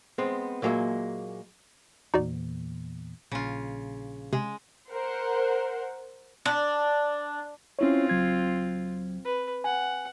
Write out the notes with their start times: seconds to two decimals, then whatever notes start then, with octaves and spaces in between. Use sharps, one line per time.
0.18 G#3 B3 C4
0.62 A#2 F#3 G#3 A#3 E5
2.14 E2 A#2 D#4 F#4 D5
3.31 A#1 C#3 F4
4.33 C3 G#3
4.92 A#4 C5 F#5
6.46 D4
7.79 C4 C#4 E4 F4 C#5
8.09 C#2 F#3 G#6
9.24 B4
9.64 F#5 G#5